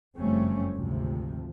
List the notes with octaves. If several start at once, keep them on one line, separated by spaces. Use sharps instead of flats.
F#1 F2 G3 A3 C4 C#4
G#1 D2 C3 F3